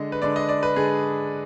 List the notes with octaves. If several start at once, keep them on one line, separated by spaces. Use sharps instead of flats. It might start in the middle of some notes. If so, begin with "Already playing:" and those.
Already playing: D3 G#3 D4 D#5
B4
D3 G#3 D4 D5
D#5
D5
B4
D3 G#3 D4 G#4